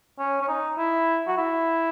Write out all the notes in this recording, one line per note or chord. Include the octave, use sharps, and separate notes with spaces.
C#4
C#4
D#4
E4
F#4
E4